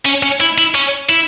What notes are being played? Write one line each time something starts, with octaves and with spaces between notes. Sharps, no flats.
C#4
C#4
E4
E4
C#4
E4